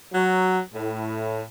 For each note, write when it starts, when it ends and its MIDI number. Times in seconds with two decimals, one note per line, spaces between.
0.12 0.59 54
0.73 1.42 45